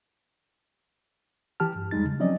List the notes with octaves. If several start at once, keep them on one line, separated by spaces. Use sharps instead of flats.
E3 G4 A5 F6
G2
E2 G3 G#3 D#4 A6
C#3
F3 F#3 C4 C#4 D5 D#5